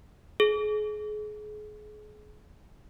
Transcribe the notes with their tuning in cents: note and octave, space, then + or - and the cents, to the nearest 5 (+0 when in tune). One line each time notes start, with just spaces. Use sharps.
G#4 +35